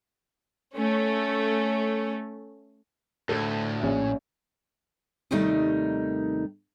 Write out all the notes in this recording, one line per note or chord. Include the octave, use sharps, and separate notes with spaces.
A3 C#4
D2 A2 A4
A#1 C#4
D#2 C3 D#3 G3 A3 D#4